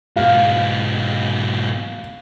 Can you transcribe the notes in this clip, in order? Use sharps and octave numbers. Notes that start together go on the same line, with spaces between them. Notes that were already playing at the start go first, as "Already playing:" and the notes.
G#2 B2 F5